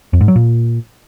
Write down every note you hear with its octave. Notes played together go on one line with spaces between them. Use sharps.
F2
G#2
F#3
A#2